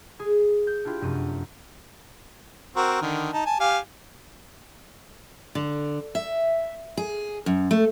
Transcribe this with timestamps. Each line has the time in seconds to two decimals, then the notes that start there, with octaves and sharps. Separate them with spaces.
0.19 G#4
0.67 G6
0.85 D4 E4 F4 G4
1.01 F1 F#2 D#7
2.76 C4 F#4 A#4
3.02 D3 D#3
3.33 D#4 A5
3.46 G#5 A5
3.60 G4 F5 G#5
5.55 D3
6.15 E5
6.97 G#4
7.46 F#2
7.71 A3